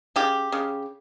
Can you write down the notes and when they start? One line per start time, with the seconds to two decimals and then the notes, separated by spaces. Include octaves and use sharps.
0.16 C#3 G4
0.52 C#3